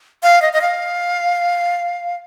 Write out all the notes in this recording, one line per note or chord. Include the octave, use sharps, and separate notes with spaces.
F5
D#5
D#5
F5